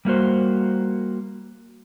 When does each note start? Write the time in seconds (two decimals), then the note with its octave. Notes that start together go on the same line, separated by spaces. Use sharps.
0.05 G3 A#3 F#4 C5